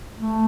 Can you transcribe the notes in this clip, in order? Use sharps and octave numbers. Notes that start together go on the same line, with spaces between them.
A3